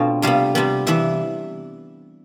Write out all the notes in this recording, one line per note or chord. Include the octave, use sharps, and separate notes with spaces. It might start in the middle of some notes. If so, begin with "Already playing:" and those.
Already playing: B2 A3 C4 D4 F4
C3 G3 B3 F5
C3 G3 B3
C3 E3 B3 E5